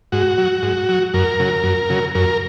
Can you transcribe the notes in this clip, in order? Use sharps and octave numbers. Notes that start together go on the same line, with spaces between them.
G#2 F#4
F#3
G#2
F#3
F#2 A#4
C#3 F#3
F#2
C#3 F#3
F#2 A#4